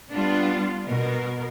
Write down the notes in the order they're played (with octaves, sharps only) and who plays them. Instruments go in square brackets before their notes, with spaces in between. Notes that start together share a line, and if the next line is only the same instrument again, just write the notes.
[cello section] G3 B3 D4 F4
B2 A#4